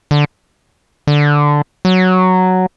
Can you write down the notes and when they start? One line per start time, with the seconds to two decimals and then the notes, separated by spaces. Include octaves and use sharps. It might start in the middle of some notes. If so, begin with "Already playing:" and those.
0.11 D3
1.07 D3
1.85 F#3